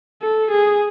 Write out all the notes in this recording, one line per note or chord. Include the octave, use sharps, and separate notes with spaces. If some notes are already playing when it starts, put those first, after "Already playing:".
A4
G#4